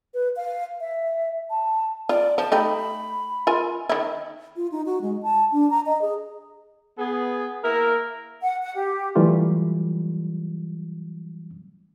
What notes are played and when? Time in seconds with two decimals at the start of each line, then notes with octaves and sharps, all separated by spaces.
0.14 B4
0.36 F5
0.80 E5
1.50 A5
2.09 F4 D5
2.38 F3 A5
2.52 A3 D#4 G4 B5
3.47 F4 A#4 G#5
3.89 D#3 E4
4.56 F4
4.72 D#4
4.86 F#4
5.02 G#3
5.23 A5
5.52 D4
5.70 A#5
5.86 D#5
6.02 G#4
6.98 B3 G#4
7.64 A#3 E4 A#4
8.42 F#5
8.63 F#5
8.75 G4
9.16 E3 F#3 G3 A3 F4